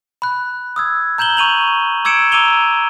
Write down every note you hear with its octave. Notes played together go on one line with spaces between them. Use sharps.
B5 F#6
D#6 E6 G#6
A#5 G6 E7 F#7 G7
C#6 D#7 F7 F#7
D6 E6 G#6 C#7 D7 E7
A#5 D6 E6 D#7 F7 G7